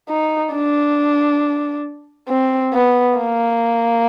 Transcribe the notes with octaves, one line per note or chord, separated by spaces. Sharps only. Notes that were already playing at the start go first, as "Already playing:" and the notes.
D#4
D4
C4
B3
A#3